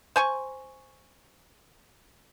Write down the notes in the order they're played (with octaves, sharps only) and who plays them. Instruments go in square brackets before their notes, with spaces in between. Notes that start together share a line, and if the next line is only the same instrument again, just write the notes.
[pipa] C5 G#5 C#6